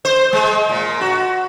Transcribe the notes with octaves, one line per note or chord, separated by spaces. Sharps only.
C5
G#3
A#2
F#4